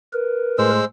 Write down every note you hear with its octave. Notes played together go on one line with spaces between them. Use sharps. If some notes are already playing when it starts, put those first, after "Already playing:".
A#4 B4
A2 G#3 C5 E6